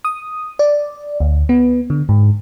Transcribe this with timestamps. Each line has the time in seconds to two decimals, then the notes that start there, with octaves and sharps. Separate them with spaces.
0.05 D#6
0.59 D5
1.20 D2
1.49 B3
1.90 D3
2.09 G#2